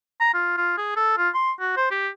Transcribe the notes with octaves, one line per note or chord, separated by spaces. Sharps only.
A#5
F4
F4
G#4
A4
F4
C6
F#4
C5
G4